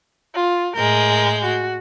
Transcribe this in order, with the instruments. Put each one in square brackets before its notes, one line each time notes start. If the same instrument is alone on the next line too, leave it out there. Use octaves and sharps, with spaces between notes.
[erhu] F4
[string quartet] A2 G#3 G6 [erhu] A#4
[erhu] F#4